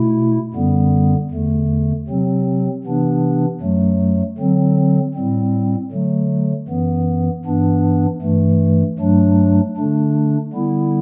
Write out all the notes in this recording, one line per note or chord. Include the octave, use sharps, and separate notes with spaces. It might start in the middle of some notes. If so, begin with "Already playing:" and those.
Already playing: B2 A3 E4
F#2 D3 G3 B3
E2 D3 A3
C3 F#3 C4
C3 E3 B3 D4
F#2 F#3 A3
D3 F#3 C4
A2 G3 C4
D3 F#3 A3
F#2 E3 B3
G2 E3 B3 D4
G2 E3 A3
G2 F#3 A3 D4
D3 A3 D4
D3 G3 B3 E4